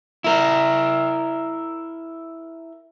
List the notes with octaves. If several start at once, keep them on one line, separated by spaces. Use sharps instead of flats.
E4 A#4